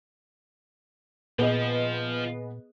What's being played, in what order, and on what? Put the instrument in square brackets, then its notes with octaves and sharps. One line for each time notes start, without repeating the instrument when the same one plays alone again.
[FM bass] A#2 [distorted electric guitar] F3 [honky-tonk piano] B3 G#4 D#5